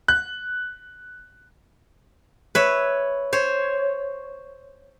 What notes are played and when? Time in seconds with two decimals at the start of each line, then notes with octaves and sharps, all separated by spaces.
0.08 F#6
2.55 B4 C#5 E5
3.33 C5 C#5